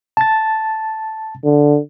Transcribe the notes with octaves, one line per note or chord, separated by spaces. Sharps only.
A5 A6
D3